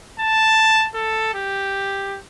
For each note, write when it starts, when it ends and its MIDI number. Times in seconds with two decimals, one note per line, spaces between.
0.19 0.87 81
0.94 1.33 69
1.34 2.18 67